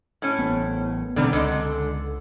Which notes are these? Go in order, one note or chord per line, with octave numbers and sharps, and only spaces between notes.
A2 C#4
A1 B3
B2 D3 D#3 G3 C4 A#5
C#2 D3 G#3